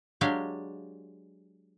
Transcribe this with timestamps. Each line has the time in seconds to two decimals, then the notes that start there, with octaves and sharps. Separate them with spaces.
0.21 F#3 G#3 D4 G4 F5